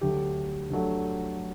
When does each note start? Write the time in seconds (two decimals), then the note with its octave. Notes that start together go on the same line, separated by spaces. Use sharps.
0.01 D2 D3 F#3 A3 G4
0.70 D2 D3 F#3 A3